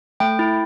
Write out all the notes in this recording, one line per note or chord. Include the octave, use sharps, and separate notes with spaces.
A3 G5
E4